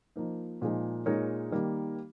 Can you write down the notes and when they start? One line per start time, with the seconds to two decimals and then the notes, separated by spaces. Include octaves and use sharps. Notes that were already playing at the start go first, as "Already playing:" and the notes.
0.16 F3 A#3 D#4
0.62 A#2 F3 G#3 D#4 G#4
1.06 A#2 G#3 D#4 A#4 C#5
1.51 D#3 G3 A#3